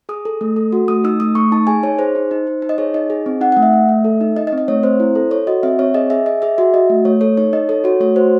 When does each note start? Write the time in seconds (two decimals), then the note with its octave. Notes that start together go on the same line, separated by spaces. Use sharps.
0.09 G#4 D#6
0.25 A4
0.41 A3
0.56 A4
0.72 F#4
0.88 A3 D#6
1.04 D#4 E6
1.20 A3 D#6
1.35 A3 C#6
1.52 D#4 A5
1.67 G#4 G#5
1.83 D#4 C#5
1.99 G#4 C5
2.15 D#4
2.31 D#4
2.47 D#4
2.62 D#4
2.69 D#5
2.78 G#4 C#5
2.94 D#4 D#5
3.10 G#4
3.26 C4
3.41 D#4 F#5
3.52 A3 F#5
3.62 E5
3.73 A3
3.89 A3
4.05 A4
4.21 D#4
4.36 D#4 D#5
4.47 D#5
4.52 C4
4.58 D#5
4.68 A3 C#5
4.83 C4 C5
5.00 E4
5.15 A4
5.31 A4 C#5
5.47 F#4 D#5
5.63 C4 E5
5.79 C4 C#5
5.94 G#4 D#5
6.10 G#4 E5
6.26 G#4 D#5
6.42 G#4 E5
6.58 F#4 E5
6.74 F#4 D#5
6.90 A3
7.05 A3 C#5
7.21 A4 C#5
7.37 D#4 C#5
7.53 D#4 D#5
7.69 A4 C#5
7.84 F#4 C#5
8.00 A3 C#5
8.16 F#4 C5